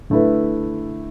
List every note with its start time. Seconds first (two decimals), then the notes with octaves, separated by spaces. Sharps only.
0.10 D3 A3 E4 B4